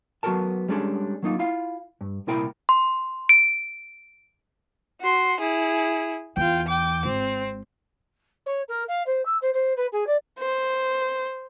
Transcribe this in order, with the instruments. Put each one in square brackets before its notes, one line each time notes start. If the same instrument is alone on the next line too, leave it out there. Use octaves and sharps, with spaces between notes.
[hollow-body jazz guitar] F#3 B3 F#4 A4 A#4 A5
G3 G#3 C#4 D4 G#4 A4
F#3 A#3 D#4 F4
E4 F4 F5
G2
C2 A#2 E4 A#4 G5 B5
[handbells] C6
D7
[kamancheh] F#4 C6
E4 G#4
[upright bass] E2 [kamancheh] F4 G5
[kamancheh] G5 D6
[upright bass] G#1 [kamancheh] C4
[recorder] C#5
A#4
F5
C5
E6
C5
C5
B4
G#4
D5
[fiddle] C5